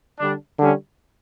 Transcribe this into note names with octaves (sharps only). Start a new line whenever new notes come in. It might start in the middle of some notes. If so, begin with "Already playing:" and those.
D3 G3 D4
D3 G3 C#4